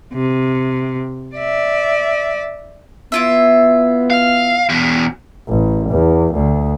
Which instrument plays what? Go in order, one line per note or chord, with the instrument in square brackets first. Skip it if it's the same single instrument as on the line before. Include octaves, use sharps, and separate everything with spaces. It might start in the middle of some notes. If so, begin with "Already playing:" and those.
[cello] C3
D5 E5
[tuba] B3 [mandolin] E4 F4 E5
[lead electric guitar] F5
E2 B2
[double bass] A1
E2
D2